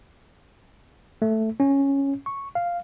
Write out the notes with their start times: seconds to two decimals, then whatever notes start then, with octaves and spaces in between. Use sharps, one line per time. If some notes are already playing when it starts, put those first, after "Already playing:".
1.22 A3
1.60 C#4
2.26 C#6
2.55 F5